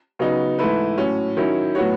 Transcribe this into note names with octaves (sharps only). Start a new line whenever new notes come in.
C#3 F#3 B3 D#4
G#2 E3 A3 E4 B4
A2 F#3 C#4
D#3 F#3 C#4 E4
A2 F#3 B3 F#4 C#5